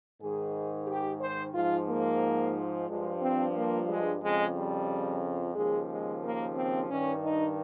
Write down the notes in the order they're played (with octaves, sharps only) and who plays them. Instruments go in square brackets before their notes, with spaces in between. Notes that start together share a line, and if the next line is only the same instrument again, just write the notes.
[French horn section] G#2 D#3 G#4
G4
C5
G#2 F3 F4
A#3
G2 F3 G#3
C4
A#3
G#3
F2 C#3 F3 G#3
G3
D#2 C#3 F3 G#3
G#3
A#3
C4
G2 D#3 C#4
D#4